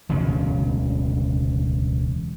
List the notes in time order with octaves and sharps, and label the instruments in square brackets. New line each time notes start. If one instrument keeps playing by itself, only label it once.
[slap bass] E1 D2 C#3 F#3